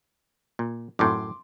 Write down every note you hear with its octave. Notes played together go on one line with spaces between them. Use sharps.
A#2
F#2 A2 C6 D6